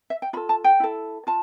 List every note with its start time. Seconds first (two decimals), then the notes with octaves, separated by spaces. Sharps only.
0.10 E5
0.22 G5
0.33 F4 B5
0.37 A4
0.49 A5
0.64 G5
0.80 E4 A4
1.27 F4 A5